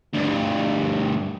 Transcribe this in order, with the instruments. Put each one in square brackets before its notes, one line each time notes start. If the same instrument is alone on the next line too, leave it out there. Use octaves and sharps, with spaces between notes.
[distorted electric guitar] D2 G2